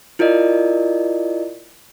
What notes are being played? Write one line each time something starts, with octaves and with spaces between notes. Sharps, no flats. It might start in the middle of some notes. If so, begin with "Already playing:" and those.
E4 F4 A#4 D5 D#5